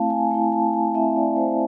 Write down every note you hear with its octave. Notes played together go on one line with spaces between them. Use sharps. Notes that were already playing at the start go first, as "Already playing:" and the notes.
Already playing: A3 C4 E4 F5 A5
G#5
A3 C4 E4 A5
A5
G#5
A3 C4 E4 E5
D5
C5